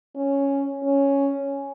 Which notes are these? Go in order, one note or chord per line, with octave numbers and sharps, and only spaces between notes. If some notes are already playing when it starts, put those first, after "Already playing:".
C#4
C#4